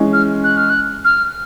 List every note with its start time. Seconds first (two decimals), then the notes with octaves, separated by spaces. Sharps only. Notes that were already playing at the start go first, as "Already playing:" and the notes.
Already playing: E3 G#3 C#4
0.13 F6
0.44 F#6
0.57 F6
0.70 F#6
1.05 F6